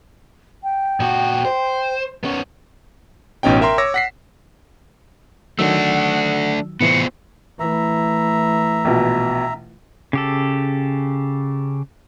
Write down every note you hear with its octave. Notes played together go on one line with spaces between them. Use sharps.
G5
A#2 F#4
C5
B3 C#4
A1 B2 C#4 D#4 G5
A#4 E5 G5 A#5 C6
C#5 D6 E6 A#6
F#5 B6 C7
D#3 F#3 A3 D4 F#5 E6
A2 C3 E3 B3 F4 C5 C#7
E3 A3 E5 A#5
A#1 B2
C#3 G4 A4